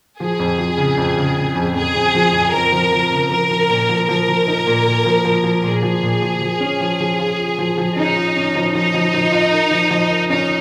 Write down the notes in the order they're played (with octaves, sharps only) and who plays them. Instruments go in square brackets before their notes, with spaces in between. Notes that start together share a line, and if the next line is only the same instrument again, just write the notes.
[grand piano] F3 [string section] G#4
[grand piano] F2
F3
C#3
F2
C#3
C#3
F2
[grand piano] F2 [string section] G#4
[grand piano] F2
F3
F2
[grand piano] F2 [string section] A#4
[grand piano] F3
F3
C#3
[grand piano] F3 [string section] A#4
[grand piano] F3
A#2
F3
[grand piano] F3 [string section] A#4
[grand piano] F3
D#4
A#2
A#2
F3
F3
F3
[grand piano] A#2 [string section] G#4
[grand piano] F3
A#2
F3
F3
C#4
F3
F3
F4
F4
F3
F3
[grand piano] C#4 [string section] D#4
[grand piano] F4
C#4
F3
[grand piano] F3 [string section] D#4
[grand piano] F3
F3
F4
A#4
F3
F3
A#4
[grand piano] C#4 [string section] D#4